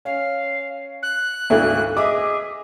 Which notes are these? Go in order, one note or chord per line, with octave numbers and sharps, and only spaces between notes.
C#4 F5
F#6
G#1 D2 C#3 A3 E4 F#4
G#4 D#5 E5 D6